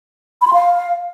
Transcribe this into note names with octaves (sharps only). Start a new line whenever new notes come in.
B5
C6
F5